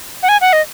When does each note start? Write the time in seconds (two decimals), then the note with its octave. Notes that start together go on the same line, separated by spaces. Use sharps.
0.23 F#5
0.29 G#5
0.41 F#5
0.53 D#5